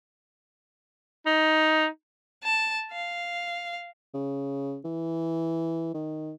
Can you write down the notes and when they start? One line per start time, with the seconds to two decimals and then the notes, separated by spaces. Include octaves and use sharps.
1.26 D#4
2.44 A5
2.92 F5
4.14 C#3
4.85 E3
5.94 D#3